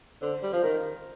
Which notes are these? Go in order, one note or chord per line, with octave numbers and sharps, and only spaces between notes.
D3 C5
G3
F3 C5
D#3 A#4